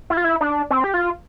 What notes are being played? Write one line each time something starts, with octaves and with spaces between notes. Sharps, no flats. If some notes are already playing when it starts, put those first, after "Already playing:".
E4
F4
E4
D4
C4
G4
F4